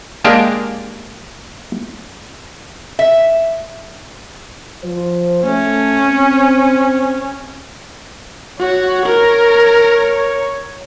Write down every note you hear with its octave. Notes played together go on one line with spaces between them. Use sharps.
G#3 A#3 D4 G4 A#4 D5
E5
F3 C5
A3 C#4
C4
F#4 C#5
A#4